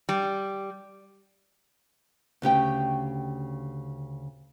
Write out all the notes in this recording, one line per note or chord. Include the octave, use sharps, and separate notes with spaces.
G3
D2 C#3 G4 G5